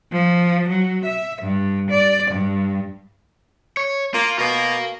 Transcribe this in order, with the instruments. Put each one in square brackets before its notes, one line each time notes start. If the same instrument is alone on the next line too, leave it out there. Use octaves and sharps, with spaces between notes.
[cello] F3
F#3
E5
G2
D5
G2
[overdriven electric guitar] C#5
[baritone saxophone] A#3 [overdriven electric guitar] F4
[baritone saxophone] B2 [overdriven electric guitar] A#4 F5